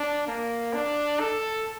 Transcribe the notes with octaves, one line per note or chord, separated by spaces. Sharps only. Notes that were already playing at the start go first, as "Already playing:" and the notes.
Already playing: D4
A#3
D4
A4